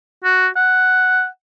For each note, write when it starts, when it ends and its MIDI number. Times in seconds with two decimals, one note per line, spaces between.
0.24 0.48 66
0.56 1.26 78